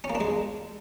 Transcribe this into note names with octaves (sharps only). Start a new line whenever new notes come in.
C#4
A#3
D4
G#3